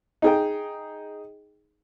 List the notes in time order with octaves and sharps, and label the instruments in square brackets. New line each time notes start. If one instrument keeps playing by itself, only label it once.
[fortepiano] D#4 G#4 G5